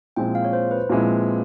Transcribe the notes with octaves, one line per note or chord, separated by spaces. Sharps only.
A#2 F3 G#3 C4 E4 G5
F5
C#5
C5
B4
A#2 F3 G#3 C4 E4